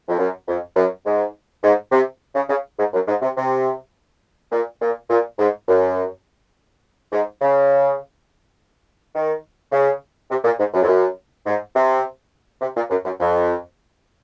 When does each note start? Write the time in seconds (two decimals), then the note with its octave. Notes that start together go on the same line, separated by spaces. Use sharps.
0.08 F2
0.19 F#2
0.48 F2
0.76 F#2
1.06 G#2
1.63 G#2
1.92 C3
2.35 C#3
2.49 C#3
2.79 G#2
2.93 F#2
3.08 G#2
3.22 C3
3.36 C3
4.52 A#2
4.81 A#2
5.10 A#2
5.39 G#2
5.68 F#2
7.12 G#2
7.41 C#3
9.15 D#3
9.72 C#3
10.30 C3
10.44 A#2
10.59 G#2
10.74 F#2
10.83 F2
10.88 F#2
11.46 G#2
11.75 C3
12.61 C3
12.76 A#2
12.90 F#2
13.05 F#2
13.19 F2